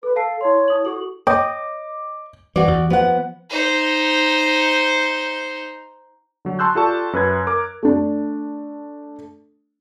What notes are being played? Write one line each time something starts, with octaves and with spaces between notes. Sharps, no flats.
A4 B4
A4 F5 A5 C7
E4 C#5 C6
E4 D#6 F#7
F#4 G4 A4 F#7
C#5 D#5 G5 D6
E3 F#4 D5
E2
F3 B3 F#5
D#4 C5
D3 F#3
A5 C6 C#6 E6 F#6 G6
F4 G4 A4 D5 A5 C#6
F#2 B4 G#6
A#4 D6
A3 D4